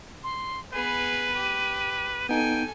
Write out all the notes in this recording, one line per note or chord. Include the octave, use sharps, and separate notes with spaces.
C6
B3 G#4 B4 D#7
G4
B3 D#4 A4 G5 G#5